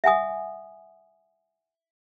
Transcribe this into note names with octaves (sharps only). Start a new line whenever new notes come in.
E5 F#5 G#5 D#6